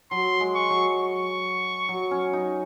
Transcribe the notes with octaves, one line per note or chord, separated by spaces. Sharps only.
F#3 C6
G#3
C#6
F#3
C#6
F#3
C#4
D#4